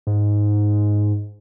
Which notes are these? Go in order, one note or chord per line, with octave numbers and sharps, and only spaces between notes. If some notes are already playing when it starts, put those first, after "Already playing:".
G#2